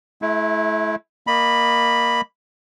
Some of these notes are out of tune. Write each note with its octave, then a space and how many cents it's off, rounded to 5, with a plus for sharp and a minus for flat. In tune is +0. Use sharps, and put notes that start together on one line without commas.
A3 -40 E4 +0
A#3 +0 D#5 -30 B5 +0